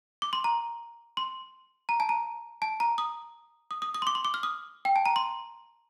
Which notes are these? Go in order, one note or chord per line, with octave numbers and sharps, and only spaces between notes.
D6
C6
A#5
C6
A#5
A5
A#5
A5
A#5
D#6
D#6
D#6
D#6
C6
D6
C6
D6
F6
D#6
G5
A5
A#5
C6